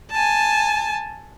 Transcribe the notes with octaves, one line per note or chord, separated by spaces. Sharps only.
G#5 A5